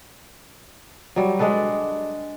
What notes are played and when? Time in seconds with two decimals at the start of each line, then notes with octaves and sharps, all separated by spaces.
1.16 F#3 G3
1.39 G#3 D4 A4 B4